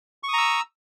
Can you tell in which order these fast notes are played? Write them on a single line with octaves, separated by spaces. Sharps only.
C#6 D#6 A#5 E6